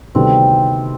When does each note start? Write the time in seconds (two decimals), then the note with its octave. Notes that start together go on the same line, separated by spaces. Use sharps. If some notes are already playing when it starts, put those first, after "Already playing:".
0.15 D2 C3 D#3 G3 B3 C4